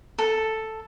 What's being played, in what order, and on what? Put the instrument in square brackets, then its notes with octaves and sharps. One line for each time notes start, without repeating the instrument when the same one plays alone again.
[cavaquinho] A4